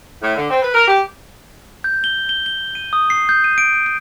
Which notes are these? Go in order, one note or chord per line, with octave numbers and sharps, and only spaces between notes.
A2
D3
C4
B4
A#4
G4
G6
G7
G7
G7
D#7
D#6
C7
G6
D#7
D7
D7